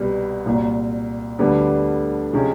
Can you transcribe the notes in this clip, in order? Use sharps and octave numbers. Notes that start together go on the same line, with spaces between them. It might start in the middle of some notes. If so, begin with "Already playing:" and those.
Already playing: C2 B2 G3 B3
C2 A#2 F#3
D2 D3 G3 B3 D4
C3 F3 G#3 C#4